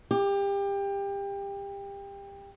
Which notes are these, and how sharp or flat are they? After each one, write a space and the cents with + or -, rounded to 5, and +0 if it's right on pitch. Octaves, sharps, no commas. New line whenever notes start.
G4 +25